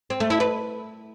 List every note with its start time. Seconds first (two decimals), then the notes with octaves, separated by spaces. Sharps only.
0.10 C4
0.20 A3
0.30 E4
0.40 B4